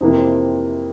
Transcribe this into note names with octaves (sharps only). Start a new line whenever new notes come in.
F2 C3 E3 A#3